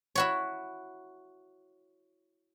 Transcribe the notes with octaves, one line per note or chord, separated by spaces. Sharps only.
E4 F#4 C#5